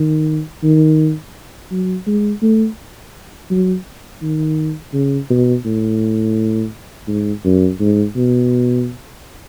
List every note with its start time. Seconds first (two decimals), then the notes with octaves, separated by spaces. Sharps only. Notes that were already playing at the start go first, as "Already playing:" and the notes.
Already playing: D#3
0.63 D#3
1.71 F#3
2.07 G#3
2.42 A3
3.50 F#3
4.22 D#3
4.93 C#3
5.30 B2
5.65 A2
7.08 G#2
7.44 F#2
7.80 G#2
8.15 B2